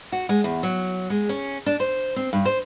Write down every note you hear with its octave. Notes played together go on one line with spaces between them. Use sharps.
F#4
G#3
E2
F#3
G#3
C#4
D4
C5
C4
G2
C5